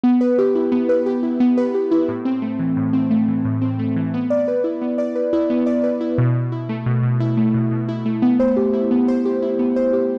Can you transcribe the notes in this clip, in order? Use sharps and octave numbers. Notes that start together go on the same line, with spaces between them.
B3
B4
G4
E4
B3
B4
G4
E4
B3
B4
G4
E4
A2
C4
A3
E3
A2
C4
A3
E3
A2
C4
A3
E3
B3
D5
B4
E4
B3
D5
B4
E4
B3
D5
B4
E4
B2
B2
E4
A3
B2
B2
E4
A3
B2
B2
E4
A3
B3
C5
G4
E4
B3
C5
G4
E4
B3
C5
G4